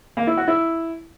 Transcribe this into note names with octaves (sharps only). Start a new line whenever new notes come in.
A#3
E4
F#4
E4